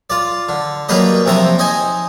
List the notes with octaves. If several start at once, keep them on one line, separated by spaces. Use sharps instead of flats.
F4 D5
D3
F#3 G3 A#3 B4 C5 D#5
F2 C3 C4 E5 A#5 C6
D#4 C5 D#5 G#5